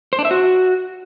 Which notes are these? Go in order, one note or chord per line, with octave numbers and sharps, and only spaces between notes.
C5
D4
E5
F#4